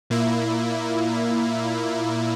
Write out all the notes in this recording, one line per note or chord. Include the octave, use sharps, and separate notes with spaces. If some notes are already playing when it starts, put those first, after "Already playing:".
A#2 A#3 E4